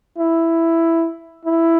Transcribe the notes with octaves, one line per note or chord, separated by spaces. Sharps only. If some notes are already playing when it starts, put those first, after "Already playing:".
E4
E4